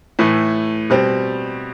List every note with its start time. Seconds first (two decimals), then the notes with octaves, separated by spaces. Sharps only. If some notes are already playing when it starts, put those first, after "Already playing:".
0.19 A2 E3 A3
0.90 B2 G3 C4